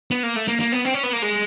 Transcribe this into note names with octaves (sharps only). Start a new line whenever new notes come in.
B3
A#3
A3
A#3
A#3
B3
C4
C#4
B3
A#3
G#3